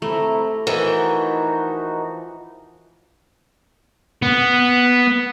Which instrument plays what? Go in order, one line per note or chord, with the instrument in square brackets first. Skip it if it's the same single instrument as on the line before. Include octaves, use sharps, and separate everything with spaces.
[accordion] C3 E4 A#5 [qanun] A3
[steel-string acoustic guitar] E3 F3 [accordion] D#4 F#4 [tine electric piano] A#4
[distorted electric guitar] B3